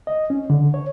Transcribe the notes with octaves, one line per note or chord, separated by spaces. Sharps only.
D#5
C#4
D3
C#5